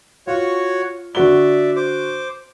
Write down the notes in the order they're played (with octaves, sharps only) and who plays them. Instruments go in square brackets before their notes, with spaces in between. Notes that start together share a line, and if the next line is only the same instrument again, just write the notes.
[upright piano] F4 [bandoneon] F#4 C#5
[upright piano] D3 F#4 G7 [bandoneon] D5 E5
[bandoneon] C5 D6